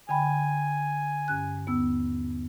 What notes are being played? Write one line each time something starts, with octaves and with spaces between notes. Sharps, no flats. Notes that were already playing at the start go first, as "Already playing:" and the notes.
D3 G5 G#5 B5
G2 C#4 F#6
D#2 B3 E6